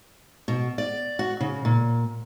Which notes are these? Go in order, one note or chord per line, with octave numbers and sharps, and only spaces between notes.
B2
D5
F#4
C#3
A#2